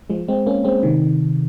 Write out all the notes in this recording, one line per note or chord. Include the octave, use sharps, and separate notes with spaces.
F3 G#3
G#3 C4
A#3 C#4
G#3 C4
C3 D#3